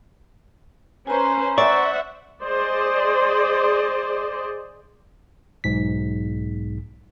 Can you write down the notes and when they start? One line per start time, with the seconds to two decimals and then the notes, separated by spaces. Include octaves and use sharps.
1.07 C#4 B4 C5 G#5 A#5
1.58 C5 D5 E5 F#5 C#6
2.43 G#4 C5 D5 D#5
5.64 B1 G#2 B6